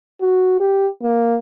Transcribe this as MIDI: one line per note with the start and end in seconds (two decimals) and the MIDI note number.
0.21 0.56 66
0.60 0.88 67
1.02 1.37 58